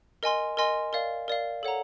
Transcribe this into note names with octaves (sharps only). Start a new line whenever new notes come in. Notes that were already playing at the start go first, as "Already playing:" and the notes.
A#4 D#5 G#5 C6
A#4 D#5 G#5 C6
A#4 D5 F5
A#4 D5 F5
A4 C#5 F#5 A#5